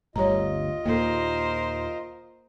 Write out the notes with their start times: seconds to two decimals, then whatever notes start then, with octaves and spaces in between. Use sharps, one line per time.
0.16 G1 D2 G3 F4 C#5 D#5 A#5
0.86 D#2 A#2 A#3 A4 A#4 C5